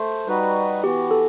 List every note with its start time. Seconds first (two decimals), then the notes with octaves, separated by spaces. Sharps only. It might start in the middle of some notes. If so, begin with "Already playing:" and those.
Already playing: A3 C5
0.27 G3 D#4 F#4 B4
0.83 E3 B3 F#4 G4
1.11 A4